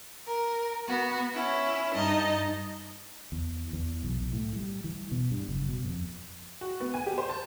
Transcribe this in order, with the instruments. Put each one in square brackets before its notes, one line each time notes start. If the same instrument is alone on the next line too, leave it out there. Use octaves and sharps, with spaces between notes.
[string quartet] A#4
B3 F#4
C#4 E4
G2 D#4 D#5 A5
[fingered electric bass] E2
E2
B1
B1
A2
G3
E3
B2
G2
F#1
B2
F2
[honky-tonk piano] F#4
B3
G#5
G4
C5
A5